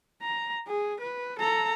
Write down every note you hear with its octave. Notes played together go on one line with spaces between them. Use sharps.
A#5
G#4
B4
A4 A#5